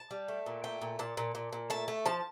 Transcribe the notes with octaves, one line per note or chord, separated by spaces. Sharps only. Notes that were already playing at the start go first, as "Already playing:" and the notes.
Already playing: A5
G3
A3
A#2
A3 G5
A#2
A#2 A5
A#2
A#2
A#2
A3 A5
A3
F3 A5